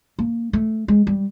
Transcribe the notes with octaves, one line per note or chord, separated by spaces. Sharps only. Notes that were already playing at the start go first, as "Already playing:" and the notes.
A#3
A3
G#3
G3